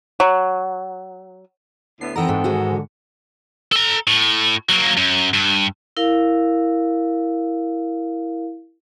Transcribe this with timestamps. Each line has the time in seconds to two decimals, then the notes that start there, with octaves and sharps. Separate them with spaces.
0.20 F#3
2.01 D2 A2 B3 C7
2.16 E3 B3 C4 D#4 A4 A#4 A#5
2.29 G#2 E3
2.44 D#3 G#3 F#4
2.72 D3
3.72 A4 A#5
4.07 A2
4.69 F#3 A#3
4.97 F#2
5.34 G2
5.97 E4 A#4 F5